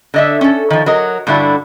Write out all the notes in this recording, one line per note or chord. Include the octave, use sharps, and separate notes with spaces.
D3 D#5 E5
C#4 A4
D#3 F3
F#3 A#4 D#5
G2 D3 D4 E4 F#4